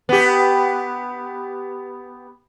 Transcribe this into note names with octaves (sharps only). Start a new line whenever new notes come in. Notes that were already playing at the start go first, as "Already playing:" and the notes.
B3 G4